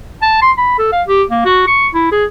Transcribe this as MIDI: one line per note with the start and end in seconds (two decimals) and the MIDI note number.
0.22 0.38 81
0.42 0.52 84
0.58 0.76 83
0.78 0.87 69
0.92 1.02 77
1.08 1.23 67
1.30 1.43 58
1.45 1.63 66
1.67 1.87 85
1.94 2.11 64
2.12 2.25 68